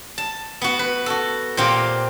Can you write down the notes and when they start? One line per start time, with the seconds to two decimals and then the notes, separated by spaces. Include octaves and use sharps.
0.18 A5
0.62 B3 F#4
0.79 B4
1.06 F#4 A4
1.57 A#2 C4 F4 G4